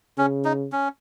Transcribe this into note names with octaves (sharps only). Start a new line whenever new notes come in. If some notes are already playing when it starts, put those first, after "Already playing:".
C#3 C#4
D#4
C#4